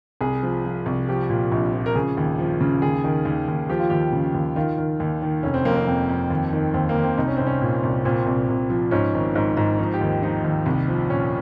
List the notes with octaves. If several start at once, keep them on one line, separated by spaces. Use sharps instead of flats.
C2 G#4
F3
F3
C2
F3 G4
A#2
A#1
F3
A#4
C#3 G#4
D#2
F3
C#3
D#2 G#4
D#3
D#2
D#2
F3 G4
F4
D#2 G4
C#3
D#2
D#3 F4
D#3
D#2
D#3
F1 C#4
C4
F2 A#3
C4
F2
F2
D#2
D#3
D#2 C4
A#3
D#2
C4
C2 D#4
C#4
C2 C4
C#4
A#2
C2
A#2 C4
C2
C2
F3
G#2 C#4
G#1
G#2
G#2
F3 D#4
G4
D#2
F3 D#4
D#2
C2
F3
A#2 C#4